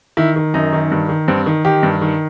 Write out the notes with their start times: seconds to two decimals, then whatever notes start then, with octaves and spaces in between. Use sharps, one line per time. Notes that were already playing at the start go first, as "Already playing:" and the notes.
0.17 D#3 E4
0.36 D#3
0.54 F#2 D#4
0.73 D#3
0.92 G2
1.09 D#3
1.28 G2 C4
1.46 D#3
1.65 D#3 G4
1.83 G2
2.01 D#3